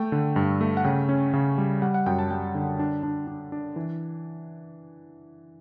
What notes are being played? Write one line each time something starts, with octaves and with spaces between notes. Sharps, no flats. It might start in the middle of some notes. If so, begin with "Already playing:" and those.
Already playing: A3 G5
D3
G2
A3
F#5
C#3 G5
C#4
C#3
G3
G3 F#5
F#5
F#2 G5
A5
G3 G5
D3
D4
D4
D4
D4
E3